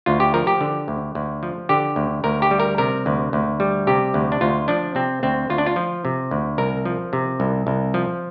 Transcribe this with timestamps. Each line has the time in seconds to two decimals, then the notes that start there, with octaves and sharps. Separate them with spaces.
0.06 D2 F4
0.20 G4
0.34 F3 A#4
0.47 G4
0.61 D3
0.88 D2
1.15 D2
1.43 F3
1.69 D3 G4
1.96 D2
2.24 D2 A#4
2.42 G4
2.51 G3
2.60 A#4
2.78 C3 A#4
3.06 D2
3.33 D2
3.60 G3
3.87 C3 G4
4.14 D2
4.32 D4
4.41 D2 F4
4.68 F3 D4
4.95 C3 C4
5.23 D2 C4
5.50 D2 F4
5.58 D4
5.66 F4
5.76 F3
6.05 C3
6.31 D2
6.58 C2 A#4
6.86 F3
7.13 C3
7.40 C2
7.67 C2
7.94 F3